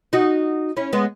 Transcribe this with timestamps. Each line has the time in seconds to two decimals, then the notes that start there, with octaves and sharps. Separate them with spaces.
0.13 D#4 F#4
0.77 C#4 E4
0.93 G#3 B3